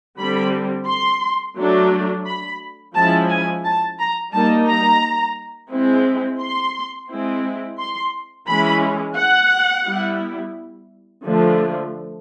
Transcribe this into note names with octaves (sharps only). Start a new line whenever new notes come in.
D3 G3 C4 B5
C6
F#3 A3 D4
B5
F3 G#3 C#4 E4 A5
G#5
A5
A#5
G3 A#3 D#4 A5
A#5
G#3 C4 E4
C6
G#3 C4 E4
C6
E3 G#3 C#4 B5
F#5
G3 B3 E4
D3 F3 A3